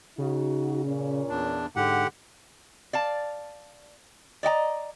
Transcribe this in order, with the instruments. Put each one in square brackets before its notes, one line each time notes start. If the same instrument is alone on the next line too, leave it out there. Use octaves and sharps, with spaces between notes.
[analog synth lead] C#3 [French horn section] D#4 F#4
[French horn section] A#2 C#4
[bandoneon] E2 D4
[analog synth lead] G#2 [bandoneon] D3 G4 F#5
[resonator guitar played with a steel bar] D5 F5 A5
D5 D#5 G5 A#5